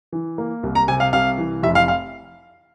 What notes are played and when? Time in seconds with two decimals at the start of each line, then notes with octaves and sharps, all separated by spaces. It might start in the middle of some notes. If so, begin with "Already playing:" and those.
0.13 E3
0.38 A#3
0.63 C2
0.75 A#5
0.88 C3 G#5
1.00 F5
1.13 C2 F5
1.38 E3
1.63 F1 E5
1.75 F5
1.88 F5